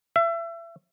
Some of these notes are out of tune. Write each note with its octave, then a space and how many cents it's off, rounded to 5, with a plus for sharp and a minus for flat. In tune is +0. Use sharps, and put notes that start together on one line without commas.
E5 +30